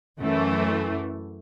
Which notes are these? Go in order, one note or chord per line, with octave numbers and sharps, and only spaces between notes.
F#2 E3 A3